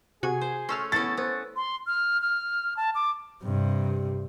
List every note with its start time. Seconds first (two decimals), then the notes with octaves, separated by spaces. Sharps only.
0.23 C3 F#4 G#4 G#5
0.41 C5
0.69 A3 C#4 C6 E6 F6
0.92 B3 C#4 E4 A4 A6
1.17 B3 C5
1.56 C6
1.87 F6
2.21 F6
2.77 A5
2.95 D6
3.43 G2 C3